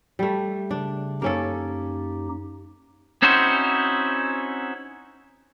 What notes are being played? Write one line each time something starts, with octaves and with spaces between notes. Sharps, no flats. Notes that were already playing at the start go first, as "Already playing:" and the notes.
G3 A3
C#3 D4
F#2 A#3 C#4 D#4 G4 A4
C4 C#4 D#4 E4 F#4 C5